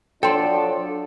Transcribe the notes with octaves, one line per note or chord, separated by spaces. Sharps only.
F3 F#3 D4 A4 G5 C6